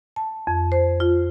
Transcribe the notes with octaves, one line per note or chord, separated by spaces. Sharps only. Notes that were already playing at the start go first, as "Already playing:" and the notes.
A5
F2
C5
F4